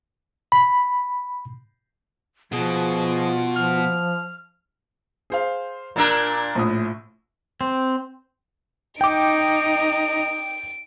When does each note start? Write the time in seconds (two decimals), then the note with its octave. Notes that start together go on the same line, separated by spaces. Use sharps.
0.52 B5
2.52 B2 F3 F4 G#4
3.56 F3 F6
5.30 G#4 C5 F5
5.96 A#2 D4 A#4 A#5 E6 F#6
6.55 A#1 A2 D#6
7.61 C4
9.01 D#4 G5 D6 D7